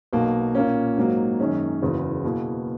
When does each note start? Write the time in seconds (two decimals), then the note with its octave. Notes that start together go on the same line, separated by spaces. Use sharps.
0.13 B1 B2 A#3
0.55 A#2 A#3 C#4
0.97 G#2 F#3 A#3
1.40 F#2 D#3 G#3 C#4
1.82 F#1 E2 C#3 F#3
2.24 B2 A#3 E4 G#4